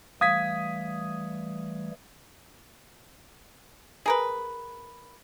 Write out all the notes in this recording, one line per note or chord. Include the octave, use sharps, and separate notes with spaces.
E3 G3 A3 F5 D#6 G#6 B6
G#4 A#4 B4